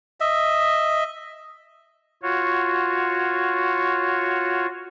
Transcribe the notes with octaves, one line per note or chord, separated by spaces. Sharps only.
D#5 E5
F4 F#4 C#5